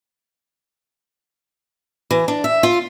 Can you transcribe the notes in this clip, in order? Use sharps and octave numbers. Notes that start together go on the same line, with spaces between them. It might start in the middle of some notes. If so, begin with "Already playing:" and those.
E3
D4
E5
F4